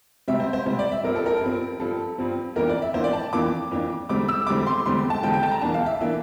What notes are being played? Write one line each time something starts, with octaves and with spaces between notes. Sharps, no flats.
C3 G3 C4 E5
C5
C5
C3 G3 C4 C5
D5
E5
G2 F3 C4 A#4
A4
A#4
G2 F3 C4
G2 F3 C4 A4
G2 F3 C4
F2 E3 A#3 D4 A#4
D5
E5
F2 E3 A#3 D4 C5
D5
A5
F2 E3 A#3 D4 D6
F2 E3 A#3 D4
E2 D3 G3 C4 D6
E6
E2 D3 G3 C4 D6
C6
E2 D3 G3 C4 C6
A5
E2 D3 G3 C4 G5
G5
A5
A#5
E2 E3 A#3 D4 A5
F5
E5
E3 A#3 D4